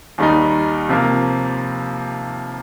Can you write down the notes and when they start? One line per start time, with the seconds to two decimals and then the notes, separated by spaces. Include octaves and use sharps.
0.18 D#2 D#3 G3 D#4
0.89 C3 F3 A#3